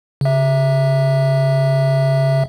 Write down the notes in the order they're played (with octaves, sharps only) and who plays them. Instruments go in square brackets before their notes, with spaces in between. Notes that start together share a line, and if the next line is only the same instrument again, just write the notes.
[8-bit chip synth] C#3 E5